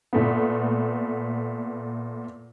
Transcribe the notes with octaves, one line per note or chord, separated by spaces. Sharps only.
A#2 A3 B3